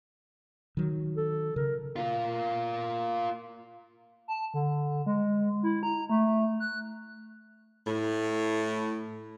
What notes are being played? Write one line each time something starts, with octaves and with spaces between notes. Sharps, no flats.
D#3 F#3
A4
C#3 A#4
A#3 F4
A5
D3
G#3
E4
A#5
A3
F#6
A2